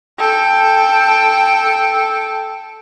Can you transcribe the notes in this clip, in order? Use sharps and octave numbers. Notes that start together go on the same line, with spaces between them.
A4 G5